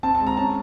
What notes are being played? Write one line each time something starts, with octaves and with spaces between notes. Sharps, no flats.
C4 A5
A5
G#3
A#5
C#4 A5